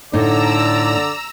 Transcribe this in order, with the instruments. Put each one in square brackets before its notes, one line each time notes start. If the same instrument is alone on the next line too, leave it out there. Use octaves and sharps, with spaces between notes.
[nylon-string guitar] A2 D#4 [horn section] D3 D5 [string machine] A#5 E6